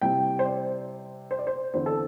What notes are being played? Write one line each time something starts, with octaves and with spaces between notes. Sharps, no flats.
C3 G3 C4 E4 G5
C5
D5
C5
D5
C5
E2 D3 C4 E4 C5
A4